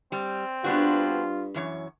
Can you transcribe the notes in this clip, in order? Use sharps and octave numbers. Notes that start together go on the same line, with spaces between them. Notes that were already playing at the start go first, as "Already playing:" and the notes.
G3 C4
G2 B3 D4 F4 F#4
F#2 E3 C#5